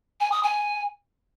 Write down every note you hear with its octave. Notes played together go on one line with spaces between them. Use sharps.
G#5
D#6
G#5